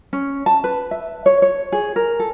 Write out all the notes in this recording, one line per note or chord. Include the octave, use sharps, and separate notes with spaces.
C#4
A5
B4
E5
C#5
C#5
G#4
A#4
A4